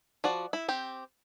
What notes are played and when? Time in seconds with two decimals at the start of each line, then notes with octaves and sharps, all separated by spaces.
0.24 F3 F#4 D5
0.53 E4
0.68 C4 G4